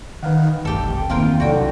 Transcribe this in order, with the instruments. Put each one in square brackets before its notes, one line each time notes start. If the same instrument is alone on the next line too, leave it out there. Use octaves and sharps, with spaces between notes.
[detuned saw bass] D#3 [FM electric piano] B4 F5 F#5
[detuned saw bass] F1 [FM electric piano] B1 E2 G2 [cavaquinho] G4 A4
[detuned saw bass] E2 [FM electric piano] D#3 A#3 C4 [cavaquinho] F4 A#4 G5
[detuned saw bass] C2 [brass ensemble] D3 F#3 [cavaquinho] F#4 G5